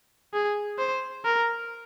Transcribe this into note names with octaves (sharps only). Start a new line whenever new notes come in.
G#4
C5
A#4